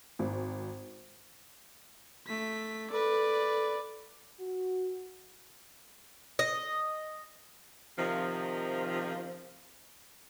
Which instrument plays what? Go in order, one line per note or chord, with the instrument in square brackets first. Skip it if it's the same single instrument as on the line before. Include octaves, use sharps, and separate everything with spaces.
[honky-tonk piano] G#1
[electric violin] A3 B6
[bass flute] A4 [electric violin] B4 D5
[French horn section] F#4
[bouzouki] D#5
[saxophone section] C3 D#3 F3